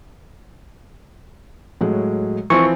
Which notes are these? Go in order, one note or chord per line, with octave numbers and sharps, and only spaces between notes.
A2 F#3 G#3
E3 F3 C4 C#6